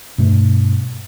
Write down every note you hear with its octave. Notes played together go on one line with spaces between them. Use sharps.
G2 B2 A3